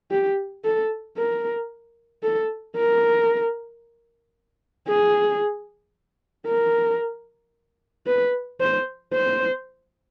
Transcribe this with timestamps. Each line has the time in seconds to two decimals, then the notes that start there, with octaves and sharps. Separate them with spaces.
0.11 G4
0.64 A4
1.17 A#4
2.23 A4
2.77 A#4
4.89 G#4
6.47 A#4
8.06 B4
8.60 C5
9.13 C5